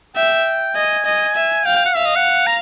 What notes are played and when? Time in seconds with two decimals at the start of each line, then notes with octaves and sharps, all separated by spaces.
0.16 E5 G5
0.76 D#5 G#5
1.06 D#5
1.36 E5
1.65 F5 G5
1.76 G5
1.86 F#5
1.96 E5 F5
2.06 D#5
2.16 F#5
2.47 A#5